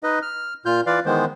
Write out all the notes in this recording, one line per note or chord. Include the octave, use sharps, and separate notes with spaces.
D#4 B4 D#5
F6
A#2 F4 F6 G6
E3 F4 B4 D5 F5
D#3 E3 G#3 B3 C5